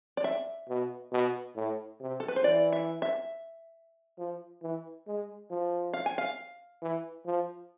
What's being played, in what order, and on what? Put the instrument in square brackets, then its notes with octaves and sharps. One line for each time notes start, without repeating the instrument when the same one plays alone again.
[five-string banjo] D5
E5
[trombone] B2
B2
A2
C3
[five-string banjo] A4
B4
C5
[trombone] E3 [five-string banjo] D5
[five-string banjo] E5
E5
[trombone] F3
E3
G#3
F3
[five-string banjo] F5
G#5
F5
[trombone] E3
F3